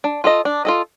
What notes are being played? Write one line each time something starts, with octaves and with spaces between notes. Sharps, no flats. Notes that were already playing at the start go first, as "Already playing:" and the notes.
D4
F4 A4 D#5
D4
F4 A4 D#5